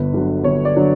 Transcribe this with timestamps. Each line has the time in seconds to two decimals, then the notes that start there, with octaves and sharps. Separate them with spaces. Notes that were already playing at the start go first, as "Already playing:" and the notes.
Already playing: G1 B4
0.13 G2 D3 F#3
0.44 G1 C#5
0.65 D5
0.76 D3 F#3